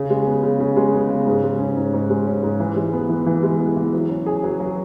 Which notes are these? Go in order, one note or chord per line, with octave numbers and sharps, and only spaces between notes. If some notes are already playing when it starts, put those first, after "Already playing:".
Already playing: C#3
G#3
B3
C#3
C#3
G#3
B3
C#3
G#2
G#3
C#4
G#2
G#2
G#3
C#4
G#2
E3
G#3
B3
E3
E3
G#3
B3
E3
F#3
C#4
G#4
F#3
F#3